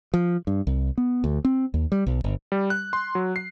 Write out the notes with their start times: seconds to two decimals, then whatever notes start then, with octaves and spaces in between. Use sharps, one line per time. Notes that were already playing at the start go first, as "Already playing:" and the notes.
0.14 F3
0.47 G2
0.67 C2
0.98 B3
1.24 D2
1.45 C4
1.74 D#2
1.92 G3
2.07 B1
2.24 G1
2.52 G3
2.70 F#6
2.93 C6
3.15 F#3
3.36 C7